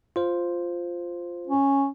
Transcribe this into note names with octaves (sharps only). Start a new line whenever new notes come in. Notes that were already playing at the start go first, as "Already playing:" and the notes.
F4 C5
C#4